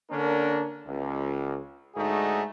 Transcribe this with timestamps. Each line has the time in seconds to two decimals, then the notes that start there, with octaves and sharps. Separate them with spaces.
0.11 D3 A#3 C#4 D4 A#4
0.86 C#2
1.95 G#2 D3 A3 D#4 F#4 G#4